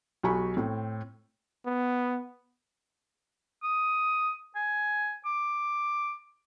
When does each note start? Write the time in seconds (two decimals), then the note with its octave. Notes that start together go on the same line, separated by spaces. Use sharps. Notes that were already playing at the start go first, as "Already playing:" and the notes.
0.23 B1 F#4 G4 G#5 B5 C#6
0.57 A2 C4
1.66 B3
3.64 D#6
4.56 G#5
5.26 D6